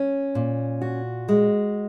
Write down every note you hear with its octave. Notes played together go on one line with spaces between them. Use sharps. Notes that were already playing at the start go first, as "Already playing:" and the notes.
Already playing: C#4
A#2
F#4
G#3